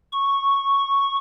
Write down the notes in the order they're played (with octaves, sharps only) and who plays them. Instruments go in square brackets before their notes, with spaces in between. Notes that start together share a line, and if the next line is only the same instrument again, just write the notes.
[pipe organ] C#6